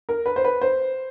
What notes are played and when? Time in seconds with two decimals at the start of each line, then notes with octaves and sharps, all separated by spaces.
0.09 A#4
0.26 B4
0.36 C5
0.44 B4
0.62 C5